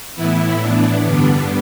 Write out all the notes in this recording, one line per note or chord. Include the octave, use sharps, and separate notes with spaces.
A2 E3 B3 E4
D4
G2 D3 G3 B3 D4